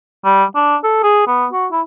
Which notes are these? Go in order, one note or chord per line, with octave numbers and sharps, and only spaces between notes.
G3
D4
A4
G#4
B3
F#4
E4